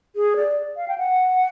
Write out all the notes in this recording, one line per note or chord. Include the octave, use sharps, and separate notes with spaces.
G#4
D5
F5
G5
F#5